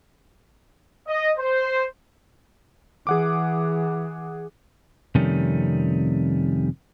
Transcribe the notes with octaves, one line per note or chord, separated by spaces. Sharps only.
D#5
C5
E3 G#4 F#5 D6
F2 C3 D#3 G3 A3 C#4